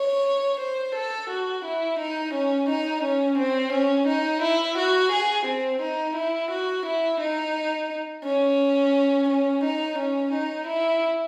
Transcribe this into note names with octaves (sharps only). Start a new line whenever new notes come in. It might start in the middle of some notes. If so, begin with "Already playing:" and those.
Already playing: C#5
C5
A4
F#4
E4
D#4
C#4
D#4
C#4
C4
C#4
D#4
E4
F#4
G#4
C4
D#4
E4
F#4
E4
D#4
C#4
C#4
D#4
C#4
D#4
E4